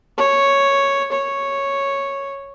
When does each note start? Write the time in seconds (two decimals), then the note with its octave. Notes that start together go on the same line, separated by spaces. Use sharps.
0.18 C#5
1.12 C#5